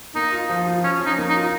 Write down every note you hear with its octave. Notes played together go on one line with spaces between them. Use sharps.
A#3 D#4
F4
F3
F4
F3 C#4
C#4
D#4
A#3
D#4
F4